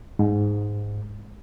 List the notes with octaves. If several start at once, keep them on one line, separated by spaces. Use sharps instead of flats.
G#2